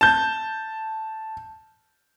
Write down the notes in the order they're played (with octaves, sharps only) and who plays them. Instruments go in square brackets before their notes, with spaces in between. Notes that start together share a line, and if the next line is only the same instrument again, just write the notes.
[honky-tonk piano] A5 G6